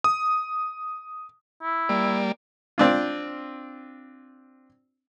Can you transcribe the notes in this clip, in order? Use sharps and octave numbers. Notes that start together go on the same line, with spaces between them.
D#6
E4
G3 A#3 D5
C4 D4 F4